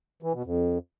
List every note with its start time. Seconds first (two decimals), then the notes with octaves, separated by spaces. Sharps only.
0.23 E3
0.34 B2
0.45 F2